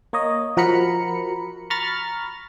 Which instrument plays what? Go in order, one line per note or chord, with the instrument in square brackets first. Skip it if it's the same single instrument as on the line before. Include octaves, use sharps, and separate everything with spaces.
[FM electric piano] A#3 C#5 D#5
F3 F#4 A#4 A#5 B5 C#7
A#5 B5 C#6 F6 A6